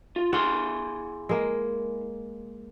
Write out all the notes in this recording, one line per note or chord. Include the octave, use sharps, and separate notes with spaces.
F4
E4 G#4 F5 F#5 C6
G#3 A#3